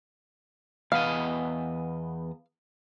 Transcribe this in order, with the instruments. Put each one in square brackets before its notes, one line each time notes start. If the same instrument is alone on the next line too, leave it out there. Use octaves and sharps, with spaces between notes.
[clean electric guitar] E2 B3 D#5 [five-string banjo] F5